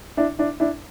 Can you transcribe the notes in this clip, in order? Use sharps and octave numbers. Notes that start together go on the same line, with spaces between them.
D4 E4
D4 E4
D4 E4